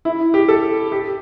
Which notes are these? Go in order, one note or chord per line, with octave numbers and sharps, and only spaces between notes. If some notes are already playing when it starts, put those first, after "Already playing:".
E4
G4
A4
G4